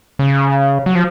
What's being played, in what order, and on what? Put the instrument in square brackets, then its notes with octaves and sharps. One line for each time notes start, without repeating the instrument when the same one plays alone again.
[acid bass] C#3
F#3
F3